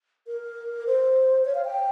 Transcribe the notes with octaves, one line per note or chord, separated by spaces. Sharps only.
A#4
C5
C#5
F5
G5